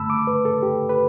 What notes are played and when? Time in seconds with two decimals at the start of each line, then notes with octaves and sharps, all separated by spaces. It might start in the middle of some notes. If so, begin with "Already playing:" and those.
Already playing: G2 D3 A3 A5 B5 E6
0.10 D6
0.27 B4
0.45 A4
0.63 G4
0.89 B4